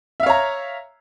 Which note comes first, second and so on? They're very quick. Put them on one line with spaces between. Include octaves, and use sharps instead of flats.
E5 F5 C#5 A#5